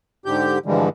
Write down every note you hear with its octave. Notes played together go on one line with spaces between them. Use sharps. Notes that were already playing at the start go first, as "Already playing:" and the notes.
G#2 D3 G4 G6
G2 D3 E3 F3 G3 G#3